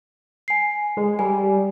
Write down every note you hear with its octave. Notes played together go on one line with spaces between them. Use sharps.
G#5 C7
G#3
G3 G#5